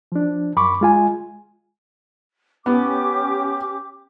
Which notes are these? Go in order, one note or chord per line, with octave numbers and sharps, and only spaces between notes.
F3 D4
F#2 B5 C#6 D6
G#3 F4 G#5
B3 C#4 G4 D6